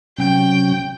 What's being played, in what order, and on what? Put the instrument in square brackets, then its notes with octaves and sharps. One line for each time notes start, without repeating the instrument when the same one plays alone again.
[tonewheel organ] C3 F#3 C#4 [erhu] G5